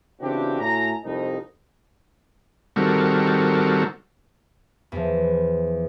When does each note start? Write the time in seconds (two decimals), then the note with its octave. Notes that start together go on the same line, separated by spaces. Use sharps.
0.21 C#3 E3 C4 D4 F#4 G4
0.59 A2 A3 F#4 G#5 A#5
1.03 C2 F2 D#4
2.76 D#3 G3 C4 F#4 A4 A#4
4.92 E2 F3